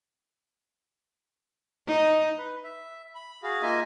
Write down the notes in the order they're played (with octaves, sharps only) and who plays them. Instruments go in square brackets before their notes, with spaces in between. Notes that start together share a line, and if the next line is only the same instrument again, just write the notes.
[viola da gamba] D#4
[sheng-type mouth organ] B4
E5
B5
F#4 G#4 F5
A#3 D#4 F4 D#5 E5 G#5